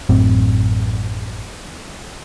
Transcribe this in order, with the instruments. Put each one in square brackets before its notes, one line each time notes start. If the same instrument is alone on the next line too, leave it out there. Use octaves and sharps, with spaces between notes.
[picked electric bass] A1 F#2 A2 C4